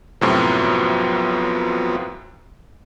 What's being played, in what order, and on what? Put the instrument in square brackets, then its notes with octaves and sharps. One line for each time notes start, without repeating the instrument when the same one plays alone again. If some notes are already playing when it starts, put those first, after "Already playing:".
[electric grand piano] F#2 A2 C3 [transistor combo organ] F3 F#3 B3